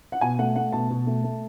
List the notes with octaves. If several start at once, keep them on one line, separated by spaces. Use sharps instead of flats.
F#5
B2 G#5
A3 F#5
A3 F#5
B2 A5
B2
A3
A3